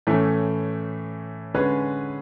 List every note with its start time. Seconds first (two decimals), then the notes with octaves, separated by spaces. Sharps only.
0.07 A2 E3 A3 C#4
1.54 D3 G#3 C#4 G#4 B4